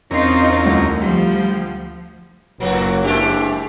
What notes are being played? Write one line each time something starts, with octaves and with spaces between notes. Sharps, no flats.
E2 C4 C#4 D#4 F4 A#4
D2
F3 G3
F#1 A2 F#3 A#3 F#4
C3 E3 G#3 D4 E4 G4